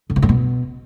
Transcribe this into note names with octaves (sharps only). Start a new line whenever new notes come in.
D3
C3
G2
B2